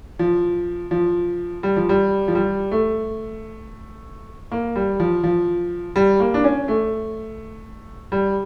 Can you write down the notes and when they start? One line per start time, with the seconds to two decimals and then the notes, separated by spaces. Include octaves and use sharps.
0.19 F3
0.91 F3
1.63 G3
1.76 F3
1.89 G3
2.28 F3
2.35 G3
2.71 A3
4.52 A#3
4.76 G3
5.00 F3
5.23 F3
5.96 G3
6.20 A#3
6.34 D4
6.44 C#4
6.68 A3
8.12 G3